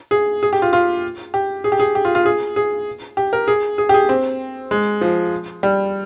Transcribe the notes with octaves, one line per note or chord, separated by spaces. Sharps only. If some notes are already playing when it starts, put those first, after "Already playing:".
G#4
G#4
G4
F4
F4
G4
G#4
G4
G#4
G4
F4
F4
G#4
G#4
G4
A#4
G#4
G#4
G4
G#4
C4
G#3
F3
G3